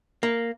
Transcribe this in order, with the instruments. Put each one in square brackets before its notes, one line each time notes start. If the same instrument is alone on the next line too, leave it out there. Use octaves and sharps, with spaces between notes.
[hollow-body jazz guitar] A#3